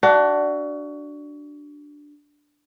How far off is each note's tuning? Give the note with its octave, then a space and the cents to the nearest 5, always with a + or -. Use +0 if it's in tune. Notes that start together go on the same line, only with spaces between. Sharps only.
D4 +0 F#4 +25 F5 -45